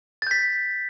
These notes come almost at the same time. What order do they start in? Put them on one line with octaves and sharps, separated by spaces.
A6 G6 B6